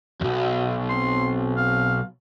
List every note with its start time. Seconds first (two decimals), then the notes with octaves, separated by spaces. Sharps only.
0.21 B1 E2 F#4
0.89 C4 C6
1.57 C4 F5